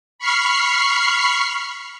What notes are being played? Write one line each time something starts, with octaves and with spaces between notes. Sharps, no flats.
B5 C#6 F6 C7